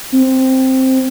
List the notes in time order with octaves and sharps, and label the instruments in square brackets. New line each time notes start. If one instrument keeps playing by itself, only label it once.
[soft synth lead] C4